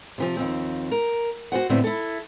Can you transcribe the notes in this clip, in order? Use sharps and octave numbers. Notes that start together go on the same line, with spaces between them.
C3 E3 F3
D#2 F3 C4
A#4
F#4 A4 C5 F#5
A2 D3 B3 C4
E4 A4